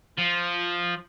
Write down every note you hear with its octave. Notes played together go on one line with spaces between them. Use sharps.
F3